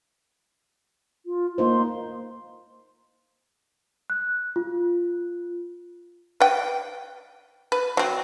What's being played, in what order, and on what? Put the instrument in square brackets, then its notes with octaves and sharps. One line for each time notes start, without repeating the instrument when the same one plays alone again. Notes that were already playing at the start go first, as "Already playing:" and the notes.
[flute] F4
[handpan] A#3 D#4 C5 [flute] C6
[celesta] F#6
F4
[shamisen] B4 G5
B4
F#3 C4